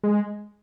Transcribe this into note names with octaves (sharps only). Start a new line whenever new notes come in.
G#3